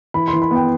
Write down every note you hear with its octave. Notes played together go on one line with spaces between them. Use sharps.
E3 B5
C6
E3
B5
B3 G5